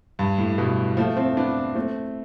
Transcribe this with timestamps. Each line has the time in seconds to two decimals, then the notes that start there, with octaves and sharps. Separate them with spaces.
0.19 G2
0.38 A2
0.58 G2 B2
0.97 F3 A3
1.17 A3 C4
1.37 B3 D4
1.75 A3 C4